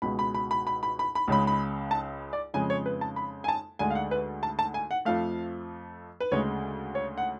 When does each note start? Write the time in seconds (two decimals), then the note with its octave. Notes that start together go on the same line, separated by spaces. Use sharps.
0.02 C#2 B2 G#3 B5
0.19 B5
0.34 B5
0.51 B5
0.67 B5
0.83 B5
0.99 B5
1.15 B5
1.28 C#2 C#3 G#3 B5
1.47 B5
1.91 A5
2.33 D5
2.54 F2 C#3 G#3 G#5
2.70 C#5
2.86 B4
3.01 A5
3.16 B5
3.44 G#5
3.48 A5
3.79 D2 D3 G#3 G#5
3.90 F5
3.95 F#5
4.11 B4
4.43 A5
4.59 A5
4.74 G#5
4.91 F#5
5.05 F2 F3 A3 F5
6.20 B4
6.31 D2 C#3 G#3 C#5
6.95 C#5
7.18 F#5